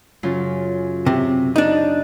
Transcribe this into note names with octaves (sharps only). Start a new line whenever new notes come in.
F#2 C#3 F4
C3
D4 D#4